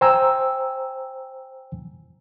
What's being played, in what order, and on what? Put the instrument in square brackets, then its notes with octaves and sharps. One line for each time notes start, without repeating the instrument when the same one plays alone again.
[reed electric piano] C5 G5 G#5 A#5 E6